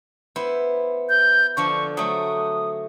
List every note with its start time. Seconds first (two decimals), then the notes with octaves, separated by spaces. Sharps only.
0.36 B3 E4 C5
1.09 G6
1.57 D3 F3 D4 C#6
1.97 F#3 A3 D#6